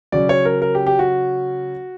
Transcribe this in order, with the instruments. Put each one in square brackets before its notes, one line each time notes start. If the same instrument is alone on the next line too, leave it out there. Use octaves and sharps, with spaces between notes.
[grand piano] C#3 F#3 C#4 D5
C#5
A#4
A#4
G4
G4
F#4